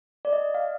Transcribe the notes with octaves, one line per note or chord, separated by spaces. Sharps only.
D5
D#5
F5